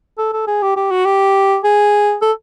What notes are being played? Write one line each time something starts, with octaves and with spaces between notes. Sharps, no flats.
A4
A4
G#4
G4
G4
F#4
G4
G#4
A4